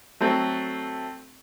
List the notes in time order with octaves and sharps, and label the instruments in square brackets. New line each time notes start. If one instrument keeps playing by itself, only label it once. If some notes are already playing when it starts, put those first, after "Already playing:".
[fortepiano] F#3 A3 C4